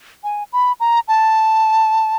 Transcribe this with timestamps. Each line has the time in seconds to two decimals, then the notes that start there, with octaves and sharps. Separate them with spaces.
0.24 G#5
0.53 B5
0.80 A#5
1.08 A5